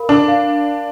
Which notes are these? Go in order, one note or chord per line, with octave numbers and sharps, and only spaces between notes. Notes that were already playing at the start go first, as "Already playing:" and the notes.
Already playing: A#4 F5 B5
D4 D6
F5